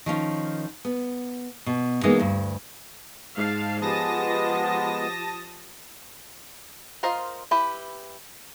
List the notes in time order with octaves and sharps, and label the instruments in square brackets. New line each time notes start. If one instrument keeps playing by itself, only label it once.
[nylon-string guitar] D#3 F3 C#4
B3
B2
E3 G#3 A#3 B3 D#4
D2 G2
[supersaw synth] G#2 [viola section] F5 A5
[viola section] F3 G4 [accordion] G#3 B3 [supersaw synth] A5 D#6 A#6
[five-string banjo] F4 A#4 C5 D#5 F5
E4 G4 B4